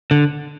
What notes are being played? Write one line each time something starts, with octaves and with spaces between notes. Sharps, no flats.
D3